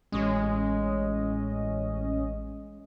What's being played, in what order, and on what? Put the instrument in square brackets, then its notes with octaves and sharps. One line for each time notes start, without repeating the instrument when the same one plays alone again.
[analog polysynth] A1 C#4 D#5 [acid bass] G#3